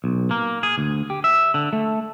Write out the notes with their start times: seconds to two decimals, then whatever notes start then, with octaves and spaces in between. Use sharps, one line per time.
0.04 B1
0.31 A#3
0.63 G#4
0.78 D2
1.10 G4
1.24 E5
1.54 D3
1.73 A3